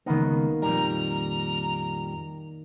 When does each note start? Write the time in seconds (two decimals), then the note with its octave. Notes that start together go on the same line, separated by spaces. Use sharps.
0.06 C#2 D#3 A#3 B3 D#4
0.62 F2 A#2 G3 A#5